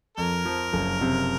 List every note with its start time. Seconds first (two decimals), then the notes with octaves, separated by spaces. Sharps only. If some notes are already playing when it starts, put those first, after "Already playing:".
0.17 F2 A#4
0.45 F3
0.73 F#1
1.01 C3